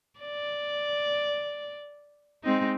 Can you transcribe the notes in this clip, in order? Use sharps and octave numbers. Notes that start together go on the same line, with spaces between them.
D5
G#3 C4 D#4